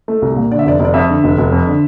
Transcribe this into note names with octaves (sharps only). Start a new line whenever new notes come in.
A3
C2
A#2
D3 D5
E5
F1 D5
F1
D5
F2 E5
D3
F1
F1
F2
D3